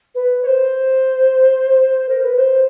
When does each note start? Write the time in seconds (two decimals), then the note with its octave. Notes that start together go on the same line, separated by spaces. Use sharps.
0.14 B4
0.42 C#5
0.46 C5
2.09 A#4
2.22 B4
2.35 C5